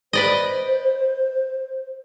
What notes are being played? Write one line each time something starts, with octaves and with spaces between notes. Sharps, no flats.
B4 C5 D5 D#5